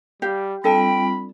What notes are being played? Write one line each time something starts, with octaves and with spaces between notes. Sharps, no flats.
G3 G4 F5
G3 C4 D4 F4 A4 E5 G5 B5